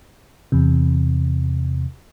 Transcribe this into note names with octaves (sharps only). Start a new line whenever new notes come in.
E2 C3